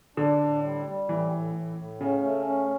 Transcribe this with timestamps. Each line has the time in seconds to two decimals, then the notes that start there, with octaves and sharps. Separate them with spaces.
0.17 D3 D4
0.40 A2
0.63 G3
0.86 G3
1.08 A2 E3
1.32 A2
1.55 A2
1.78 A2
2.00 C#3 C#4
2.23 A3
2.46 C#4